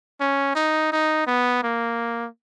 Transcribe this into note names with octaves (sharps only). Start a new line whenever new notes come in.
C#4
D#4
D#4
B3
A#3